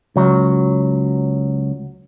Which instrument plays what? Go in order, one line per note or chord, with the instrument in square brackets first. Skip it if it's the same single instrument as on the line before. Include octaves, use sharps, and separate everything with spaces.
[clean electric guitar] C#2 F#3